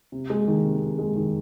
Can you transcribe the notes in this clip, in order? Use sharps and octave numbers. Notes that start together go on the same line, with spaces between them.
C3
G#3
D#3
C3
C3
G#3
D#3